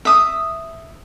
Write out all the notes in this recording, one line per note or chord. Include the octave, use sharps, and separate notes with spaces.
E5 D#6